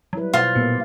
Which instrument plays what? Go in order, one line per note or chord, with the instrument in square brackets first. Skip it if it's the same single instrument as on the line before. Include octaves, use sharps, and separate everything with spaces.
[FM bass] F#3 [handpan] G3 E4 B4
[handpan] B2 C5 [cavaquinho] F4
[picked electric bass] A#2 B3 [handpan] A#3 G4